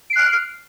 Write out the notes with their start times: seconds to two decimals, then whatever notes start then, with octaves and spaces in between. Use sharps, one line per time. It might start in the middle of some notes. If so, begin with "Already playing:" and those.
0.10 D7
0.13 C7
0.16 F#6
0.19 F6